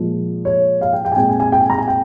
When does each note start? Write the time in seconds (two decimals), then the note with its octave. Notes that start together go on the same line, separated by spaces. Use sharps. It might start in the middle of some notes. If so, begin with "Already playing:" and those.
Already playing: A#2 F3 G#3
0.45 C#5
0.81 F5
0.93 G5
1.05 G5
1.12 G#5
1.16 A#2 G#3 C4 G5
1.29 G#5
1.40 G#5
1.52 G5
1.61 G#5
1.70 A#5
1.78 G#5
1.88 G5